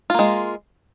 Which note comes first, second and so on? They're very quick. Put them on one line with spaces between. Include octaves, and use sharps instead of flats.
F4 A#3 G#3